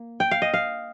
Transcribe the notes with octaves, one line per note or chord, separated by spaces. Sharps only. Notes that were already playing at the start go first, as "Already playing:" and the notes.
Already playing: A#3
G5
F5
D#5
F5